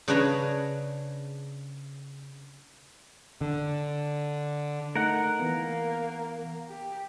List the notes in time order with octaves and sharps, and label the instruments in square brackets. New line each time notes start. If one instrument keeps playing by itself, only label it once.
[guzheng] C#3 D4 B4 C#5 G#5 A#5
[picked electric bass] D3
[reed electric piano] A3 D#4 [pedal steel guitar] A#4 F#5
[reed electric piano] E3 B3 [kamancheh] A#3
[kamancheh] G4